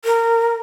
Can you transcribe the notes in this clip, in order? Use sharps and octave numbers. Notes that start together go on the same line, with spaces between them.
A#4